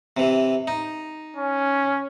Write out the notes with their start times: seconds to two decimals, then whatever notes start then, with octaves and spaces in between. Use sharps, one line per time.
0.17 C3 E3
0.67 D#4
1.36 C#4